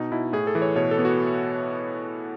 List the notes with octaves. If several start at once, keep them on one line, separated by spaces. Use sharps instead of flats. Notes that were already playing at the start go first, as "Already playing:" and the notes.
Already playing: B2 D#4
B2 E4
A2 G#4
A4
E3
C#5
B2 C#5
A4
B3
F#4